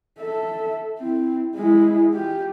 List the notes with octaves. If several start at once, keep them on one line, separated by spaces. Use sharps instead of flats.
A4 E5
C4 E4
G#3 E4
F4 G4